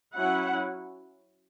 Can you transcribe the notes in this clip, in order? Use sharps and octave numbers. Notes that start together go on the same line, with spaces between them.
F#3 C#4 E4 F#5